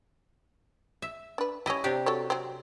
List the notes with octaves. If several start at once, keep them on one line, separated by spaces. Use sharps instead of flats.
E5
D4 B4
G3 C#4 E4 D#5
C3 D4 G4
F#4 A4 C#5
F#3 C4